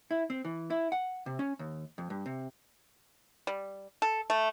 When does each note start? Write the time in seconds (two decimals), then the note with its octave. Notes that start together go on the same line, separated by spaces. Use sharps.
0.11 E4
0.30 C4
0.45 E3
0.70 E4
0.92 F#5
1.26 C3
1.39 C#4
1.59 D#2
1.98 F2
2.10 G2
2.26 C3
3.47 G3
4.02 A4
4.30 A3